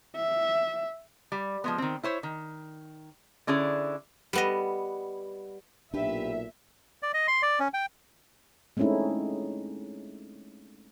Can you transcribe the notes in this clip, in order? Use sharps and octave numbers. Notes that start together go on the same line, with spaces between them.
E5
G3
F3 G#3 B3
D#3 C4
E4 C5 C#5
D#3
D3 C#4 E4 G#4 D5
G3 B3 D#5
B1 A#2 D4 G4 B4 E5
D5
D#5
C6
D5
C#4
G5
G#3 A3 C4 C#4 D#4 E4